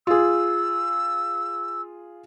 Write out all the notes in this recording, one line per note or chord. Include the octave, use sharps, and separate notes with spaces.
F4 G#4 E6